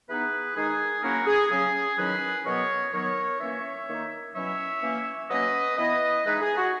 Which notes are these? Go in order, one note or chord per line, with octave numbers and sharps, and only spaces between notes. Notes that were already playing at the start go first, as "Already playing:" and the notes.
E3 B3 D#4 G#4 B4
D#3 G#3 D#4 G#4
F#3 A#3 C#4 E4 F#4 A#4
G#4
C#3 F#3 C#4 G#4
D#3 F#3 C#4 E4 G#4 B4
B2 F#3 B3 A#4 C#5
D#3 F#3 B3 A#4 C#5
E3 A#3 C#4 C#5 E5
D#3 A#3 D#4
B2 F#3 C#4 E4 C#5 E5
E3 A#3 C#4
F#3 A#3 C#4 B4 D#5
E3 B3 E4 B4 D#5
E3 G#3 D#4 G#4 B4
G#4
F#4